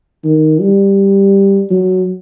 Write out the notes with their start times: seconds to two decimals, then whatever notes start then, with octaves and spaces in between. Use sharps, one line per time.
0.24 D#3
0.61 G3
1.71 F#3